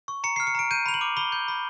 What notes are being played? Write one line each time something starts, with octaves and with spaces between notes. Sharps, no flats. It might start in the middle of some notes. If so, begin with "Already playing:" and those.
C#6
A#5 C#7
F6 C7
C#7
A#5 D7
G6 D#7
B5 F7
F#7
D6
B5 G7
G6
B5